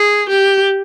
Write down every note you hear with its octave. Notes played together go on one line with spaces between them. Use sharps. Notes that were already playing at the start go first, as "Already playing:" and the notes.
Already playing: G#4
G4